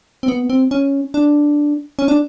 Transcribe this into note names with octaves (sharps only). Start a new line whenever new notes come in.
C4
B3
C4
C#4
D4
C#4
D4